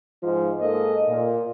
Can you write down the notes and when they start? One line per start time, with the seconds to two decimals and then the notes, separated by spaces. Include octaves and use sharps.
0.22 G#2 F3 D#4 F4
0.60 G#2 A#3 A4 D#5
1.07 A#2